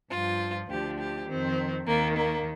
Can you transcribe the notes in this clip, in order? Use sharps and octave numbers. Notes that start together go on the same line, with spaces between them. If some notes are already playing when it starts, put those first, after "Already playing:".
G2 F3 F4
D2 D3 F3 G4
G4
F2 D#3 C4
D#2 D#3 A#3
A#3